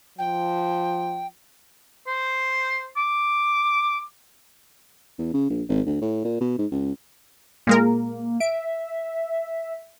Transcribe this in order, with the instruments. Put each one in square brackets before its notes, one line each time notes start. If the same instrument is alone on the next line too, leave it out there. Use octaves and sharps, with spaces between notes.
[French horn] F3 [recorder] G5
[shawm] C5
D6
[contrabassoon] E2
C#3
A#1
G#1
D2
A2
A#2
B2
G#2
C#2
[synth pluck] A#2 G#3 A#4 [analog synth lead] A#3
[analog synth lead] E5 [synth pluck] D7